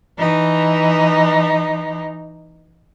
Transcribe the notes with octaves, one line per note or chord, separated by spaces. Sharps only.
E3 D#4